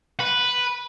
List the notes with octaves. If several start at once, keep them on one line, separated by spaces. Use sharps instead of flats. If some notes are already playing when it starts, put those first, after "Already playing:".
B4